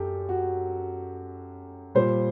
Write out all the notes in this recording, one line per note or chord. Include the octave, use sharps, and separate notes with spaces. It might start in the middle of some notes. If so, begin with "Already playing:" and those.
Already playing: F#2 G4 A4
F#4
A#2 G3 C5